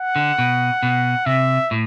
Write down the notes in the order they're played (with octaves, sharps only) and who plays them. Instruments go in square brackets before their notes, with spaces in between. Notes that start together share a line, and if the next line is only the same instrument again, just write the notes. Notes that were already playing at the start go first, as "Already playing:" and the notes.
Already playing: [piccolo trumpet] F#5
[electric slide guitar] D3
B2
B2
[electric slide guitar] C3 [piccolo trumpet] E5
[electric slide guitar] A2